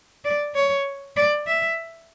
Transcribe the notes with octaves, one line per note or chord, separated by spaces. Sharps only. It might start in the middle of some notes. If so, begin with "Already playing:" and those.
D5
C#5
D5
E5